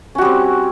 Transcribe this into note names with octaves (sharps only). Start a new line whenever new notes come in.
G3 C4 C#4 F#4